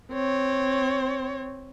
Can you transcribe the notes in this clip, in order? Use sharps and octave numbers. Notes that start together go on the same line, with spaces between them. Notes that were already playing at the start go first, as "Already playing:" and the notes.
C4 C#5